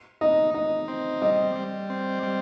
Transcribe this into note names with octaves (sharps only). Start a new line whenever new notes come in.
D#4 D#5
D#4 D#5
C4
G3 D#5
G3
C4
G3